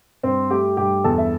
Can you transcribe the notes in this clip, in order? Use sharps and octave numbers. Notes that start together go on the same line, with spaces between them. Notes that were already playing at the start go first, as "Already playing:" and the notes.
G2 C4 C5
A3 G4 G5
G2 G4 G5
E2 A4 A5
E5